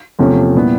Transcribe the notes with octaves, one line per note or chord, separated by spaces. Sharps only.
E2 C3 F3 A3 C#4
A#2 G3 B3 E4